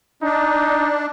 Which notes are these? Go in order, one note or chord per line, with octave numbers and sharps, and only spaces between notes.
D4 D#4